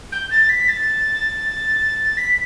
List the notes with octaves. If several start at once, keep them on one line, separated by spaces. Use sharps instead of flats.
G6
A6
B6
A6
B6